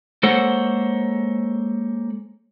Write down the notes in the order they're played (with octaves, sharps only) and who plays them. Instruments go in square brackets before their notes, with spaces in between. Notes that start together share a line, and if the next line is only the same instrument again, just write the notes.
[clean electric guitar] G#3 A#3 A4 C5 C#5 F#5